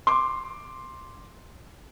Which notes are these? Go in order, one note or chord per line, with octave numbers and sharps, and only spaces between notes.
C6 D6